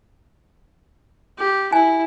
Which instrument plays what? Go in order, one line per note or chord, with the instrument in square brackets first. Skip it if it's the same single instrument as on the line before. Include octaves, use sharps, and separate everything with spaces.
[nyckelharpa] G4
[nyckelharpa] E4 [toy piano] G#5